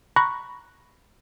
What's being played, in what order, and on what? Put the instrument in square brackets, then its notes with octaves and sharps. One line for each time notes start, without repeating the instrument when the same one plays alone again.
[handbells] A#5 B5 C#6 F#6 A#6